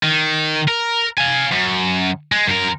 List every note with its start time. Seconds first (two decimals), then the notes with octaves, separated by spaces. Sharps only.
0.03 D#3
0.68 A#4
1.18 F5 G#5
1.52 F#2
2.32 G#3
2.48 F#2 A#4